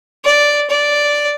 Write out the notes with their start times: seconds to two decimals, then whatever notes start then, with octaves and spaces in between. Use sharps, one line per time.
0.25 D5
0.70 D5